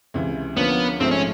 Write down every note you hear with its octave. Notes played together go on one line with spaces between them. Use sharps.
C#2 C3 E3
D3 F3 A#3 B3 C#4
A#1 G#2 F3 A3 C4
C#4